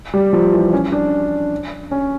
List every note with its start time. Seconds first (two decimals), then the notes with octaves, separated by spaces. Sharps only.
0.14 G3
0.33 F3
0.53 E3
0.73 C#4
0.92 D4
1.91 C#4